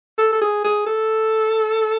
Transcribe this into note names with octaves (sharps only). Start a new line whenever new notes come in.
A4
A4
G#4
G#4
A4